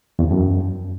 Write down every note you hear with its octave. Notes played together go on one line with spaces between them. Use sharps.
E2
C#3
F#2